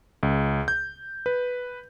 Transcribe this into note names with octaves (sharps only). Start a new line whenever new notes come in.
C#2
G6
B4